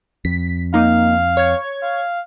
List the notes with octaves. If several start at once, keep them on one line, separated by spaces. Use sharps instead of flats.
F2 B6
A#3 D#4 F5
C#5 G#6
F5